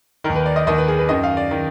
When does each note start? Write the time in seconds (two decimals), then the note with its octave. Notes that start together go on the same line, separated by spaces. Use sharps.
0.24 D#3 A#4
0.30 D#2
0.35 B4
0.46 D5
0.56 D#5
0.67 D#2 D#3 D#5
0.78 B4
0.88 G#4
0.99 B4
1.09 F#2 D#3 D#5
1.24 F5
1.37 D5
1.51 D#3